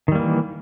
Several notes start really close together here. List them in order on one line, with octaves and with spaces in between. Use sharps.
D#3 G3 A#3 E3